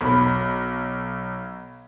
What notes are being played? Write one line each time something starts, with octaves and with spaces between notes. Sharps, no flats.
B1 B5